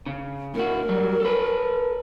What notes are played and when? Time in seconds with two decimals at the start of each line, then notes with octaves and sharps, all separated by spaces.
0.06 C#3
0.55 A2 F#4 A#4
0.89 F#3 G3
1.20 A4 B4